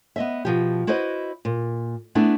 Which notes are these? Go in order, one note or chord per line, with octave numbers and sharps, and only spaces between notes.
B3 D#5 E5
B2 F3 G4
E4 F#4 B4 C5 D#5
A#2
A3 B3 D4 E4 G#4